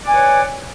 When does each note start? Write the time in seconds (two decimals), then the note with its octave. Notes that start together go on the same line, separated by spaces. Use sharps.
0.05 D5
0.08 G#5
0.11 B4
0.13 F#5
0.16 C#5